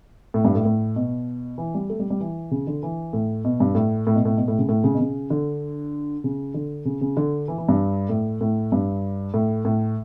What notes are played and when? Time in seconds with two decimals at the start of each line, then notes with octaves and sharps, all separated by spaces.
0.34 A2
0.45 G2
0.55 A2
0.65 A2
0.96 B2
1.58 E3
1.75 G3
1.90 A3
2.00 G3
2.10 G3
2.20 E3
2.51 C#3
2.67 D3
2.83 E3
3.13 A2
3.45 B2
3.60 G2
3.75 A2
4.07 A2
4.15 B2
4.25 A2
4.37 B2
4.48 A2
4.58 C#3
4.69 A2
4.84 C#3
4.94 B2
5.00 C#3
5.30 D3
6.24 C#3
6.54 D3
6.85 C#3
7.01 C#3
7.17 D3
7.48 E3
7.58 E3
7.69 G2
8.09 A2
8.41 A2
8.72 G2
9.34 A2
9.65 A2